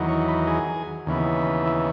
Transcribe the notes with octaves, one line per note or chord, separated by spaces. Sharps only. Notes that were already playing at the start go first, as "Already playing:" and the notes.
Already playing: E2 D#3 F#3
C#5
B4
G#4
D#2 C#3 E3 B3
E4